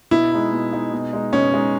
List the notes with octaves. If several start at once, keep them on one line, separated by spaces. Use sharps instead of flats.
B2 E4
G#3 D#4
B2
G#3 D#4
B2
G#3 D#4
B2 C#4
G#3 D#4